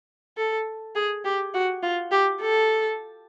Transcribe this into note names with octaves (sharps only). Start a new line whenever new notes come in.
A4
G#4
G4
F#4
F4
G4
A4